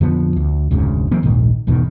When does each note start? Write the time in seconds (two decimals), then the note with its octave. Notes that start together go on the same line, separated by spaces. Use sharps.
0.01 F2 D3 F3 B3
0.36 D2
0.71 F1 D2 G#2 C#3
1.11 E3 F#3 A#3 C4
1.23 D#1 A#1 G#2 D#3
1.67 G#1 E2 B2 D#3